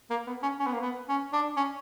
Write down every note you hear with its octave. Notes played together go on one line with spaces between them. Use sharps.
A#3
B3
C#4
C#4
B3
A#3
B3
C#4
D4
C#4